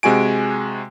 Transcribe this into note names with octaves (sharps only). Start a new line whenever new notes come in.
C3 G#3 F#4 G#5 D7